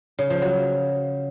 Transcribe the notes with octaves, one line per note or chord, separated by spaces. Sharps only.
C#3
F3
F#3